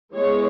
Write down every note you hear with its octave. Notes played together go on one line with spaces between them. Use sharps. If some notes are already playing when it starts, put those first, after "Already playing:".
E3 G#3 B3 C#5